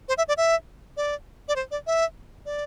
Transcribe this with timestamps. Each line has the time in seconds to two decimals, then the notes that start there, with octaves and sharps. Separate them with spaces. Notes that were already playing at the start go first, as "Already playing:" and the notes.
0.08 C5
0.18 E5
0.28 D5
0.37 E5
0.97 D5
1.48 D5
1.56 C5
1.71 D5
1.87 E5
2.46 D5